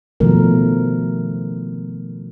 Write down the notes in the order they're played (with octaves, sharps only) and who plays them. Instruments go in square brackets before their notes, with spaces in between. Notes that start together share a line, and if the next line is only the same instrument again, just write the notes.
[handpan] B2 D#3 F3 A3 A#4